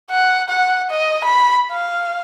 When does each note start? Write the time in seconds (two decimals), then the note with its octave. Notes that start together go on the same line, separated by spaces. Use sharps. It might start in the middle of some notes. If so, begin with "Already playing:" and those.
0.10 F#5
0.49 F#5
0.90 D#5
1.24 B5
1.71 F5